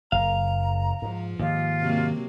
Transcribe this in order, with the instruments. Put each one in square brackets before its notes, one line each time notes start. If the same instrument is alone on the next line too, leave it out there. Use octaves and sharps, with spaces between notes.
[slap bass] F#1 [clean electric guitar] F5 [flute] A#5
[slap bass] G#2 [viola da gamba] F3
[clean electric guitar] D#2 [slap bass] G#2 [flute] F4
[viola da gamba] C3 F#3 A#3